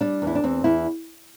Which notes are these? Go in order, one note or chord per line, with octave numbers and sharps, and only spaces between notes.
G3 D4
E2
E4
D4
E2 C4
E2 E4